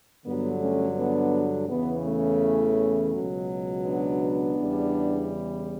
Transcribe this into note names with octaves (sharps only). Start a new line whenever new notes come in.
G2 D3 F#3 B3
A3 C#4
B3 D4
E2 C#3 E3 B3
A3 C#4
C#2 B2 F#3
B3 D4
E2 C#3 E3 G3